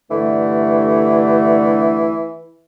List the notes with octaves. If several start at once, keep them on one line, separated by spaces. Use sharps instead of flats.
G2 D3 E3 A3